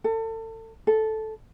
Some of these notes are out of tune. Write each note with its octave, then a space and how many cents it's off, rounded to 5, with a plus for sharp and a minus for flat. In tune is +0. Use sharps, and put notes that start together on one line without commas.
A4 +30
A4 -10